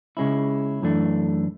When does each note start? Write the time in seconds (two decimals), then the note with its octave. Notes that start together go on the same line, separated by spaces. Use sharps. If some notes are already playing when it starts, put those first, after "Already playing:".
0.17 C#3 G#3 C#4 E4
0.82 F#2 E3 A3 D4